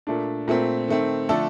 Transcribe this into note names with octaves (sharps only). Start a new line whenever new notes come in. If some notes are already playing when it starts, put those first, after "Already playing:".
A#2 A3 D4
A#2 A3 C4
D#3 A3 C4
D3 F3 A3 D4 A4